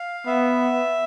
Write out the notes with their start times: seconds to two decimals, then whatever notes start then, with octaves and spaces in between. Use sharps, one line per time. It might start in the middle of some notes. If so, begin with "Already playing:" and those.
Already playing: F5
0.27 B3 E5